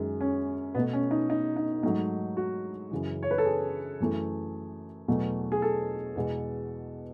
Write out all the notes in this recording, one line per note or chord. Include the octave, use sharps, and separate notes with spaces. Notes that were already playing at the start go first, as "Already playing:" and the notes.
Already playing: F#2 D#3 G#3
C#4
B2 A3 B3
C#4
D#4
D#4
D#4
G#2 F#3 A3 D#4
F#4
F#2 C#3 E3
C#5
B4
A4
G#4
F#2 E3 A3
E2 B2 F#3 A3
G#4
A4
E2 B2 G#3